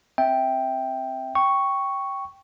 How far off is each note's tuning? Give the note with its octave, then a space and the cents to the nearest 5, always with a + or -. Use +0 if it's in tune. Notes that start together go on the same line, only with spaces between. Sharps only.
C4 +0 E5 -15 G5 +0
G5 -5 C#6 +0